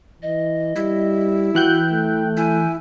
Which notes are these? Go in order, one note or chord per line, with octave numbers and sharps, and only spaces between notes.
E3 D#5
G3 E4
E3 F#4 G5 F#6 G6
A3
E4 G#5